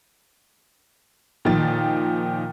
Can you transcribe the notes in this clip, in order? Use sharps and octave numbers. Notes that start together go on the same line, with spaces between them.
A#2 D#3 F3 A6